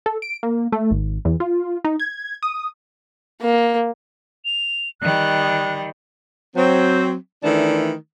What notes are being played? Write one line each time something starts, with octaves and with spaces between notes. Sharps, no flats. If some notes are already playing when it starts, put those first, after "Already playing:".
A4
D7
A#3
A3
G#1
E2
F4
D#4
G#6
D#6
A#3
F7
D#3 G3 F#6
F#3 C4
D#3 E3 A3 D4